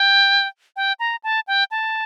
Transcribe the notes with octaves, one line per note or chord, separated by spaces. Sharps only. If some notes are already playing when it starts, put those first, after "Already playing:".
Already playing: G5
G5
A#5
A5
G5
A5